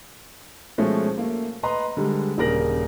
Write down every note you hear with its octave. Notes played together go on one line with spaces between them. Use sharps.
B2 F3 G#3 A3 C#4
A3 A#3
B4 D#5 A#5 C6
D3 G3 G#3
D#1 C#3 A#4 A#6 F#7